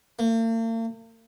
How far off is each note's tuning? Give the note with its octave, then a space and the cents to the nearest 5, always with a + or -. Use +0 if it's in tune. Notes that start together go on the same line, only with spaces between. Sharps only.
A#3 -45